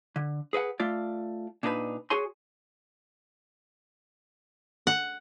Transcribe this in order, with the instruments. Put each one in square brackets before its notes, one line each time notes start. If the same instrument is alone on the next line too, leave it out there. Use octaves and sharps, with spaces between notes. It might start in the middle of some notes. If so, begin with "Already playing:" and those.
[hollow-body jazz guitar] D3
G#4 B4 D#5 F#5
A3 F4 D5
A#2 D4 D#4 G#4 B4
F#4 G#4 C#5 G#5 C6
[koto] F#5